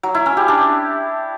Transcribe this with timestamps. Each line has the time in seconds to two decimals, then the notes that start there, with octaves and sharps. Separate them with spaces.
0.03 F#3
0.15 E4
0.26 C#4
0.37 G4
0.48 D4